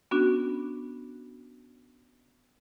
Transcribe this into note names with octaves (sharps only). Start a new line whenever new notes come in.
B3 C#4 D4 F#4